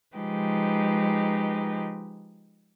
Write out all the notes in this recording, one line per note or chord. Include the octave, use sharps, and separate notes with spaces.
F3 G#3 D#4 G4 B4